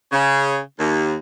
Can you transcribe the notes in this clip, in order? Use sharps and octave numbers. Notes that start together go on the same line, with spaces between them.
C#3
D#2